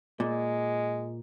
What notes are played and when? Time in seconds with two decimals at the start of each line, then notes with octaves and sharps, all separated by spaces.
0.20 A#2 G#3